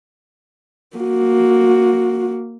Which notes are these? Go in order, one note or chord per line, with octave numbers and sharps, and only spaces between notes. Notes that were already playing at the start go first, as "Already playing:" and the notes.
A#3 F#4